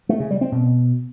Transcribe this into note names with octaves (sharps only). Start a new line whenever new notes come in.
A3
C#3
G3
C4
B2